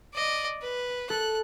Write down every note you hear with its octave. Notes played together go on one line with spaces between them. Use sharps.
D5 D#5
B4
A4 F#6